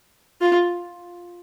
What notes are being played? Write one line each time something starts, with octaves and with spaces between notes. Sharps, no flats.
F4